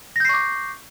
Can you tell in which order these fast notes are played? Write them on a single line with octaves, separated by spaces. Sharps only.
A#6 G6 C7 C#6 D6